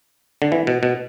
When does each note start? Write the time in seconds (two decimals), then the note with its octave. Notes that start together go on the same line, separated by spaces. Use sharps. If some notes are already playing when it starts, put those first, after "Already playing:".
0.42 D3
0.52 E3
0.67 B2
0.83 B2